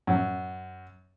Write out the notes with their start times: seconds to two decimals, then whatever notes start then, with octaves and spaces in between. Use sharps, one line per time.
0.07 F#2